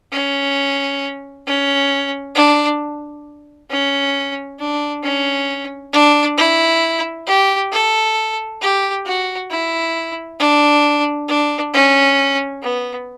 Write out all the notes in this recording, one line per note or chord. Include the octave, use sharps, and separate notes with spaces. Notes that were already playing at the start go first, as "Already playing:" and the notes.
C#4
C#4
D4
C#4
D4
C#4
D4
E4
G4
A4
G4
F#4
E4
D4
D4
C#4
B3